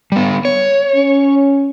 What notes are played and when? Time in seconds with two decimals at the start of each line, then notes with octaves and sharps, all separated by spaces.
0.12 G3 B3
0.45 C#5
0.95 C#4